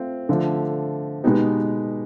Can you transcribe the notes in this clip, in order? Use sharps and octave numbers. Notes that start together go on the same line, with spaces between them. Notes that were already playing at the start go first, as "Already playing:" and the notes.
Already playing: A3 C4 F4
D3 F3 A3
B2 G#3 B3 D#4 G4